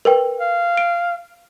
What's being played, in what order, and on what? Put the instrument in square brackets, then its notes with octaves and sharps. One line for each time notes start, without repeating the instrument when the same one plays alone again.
[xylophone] A#4 B4 G5
[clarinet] F5
[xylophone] D7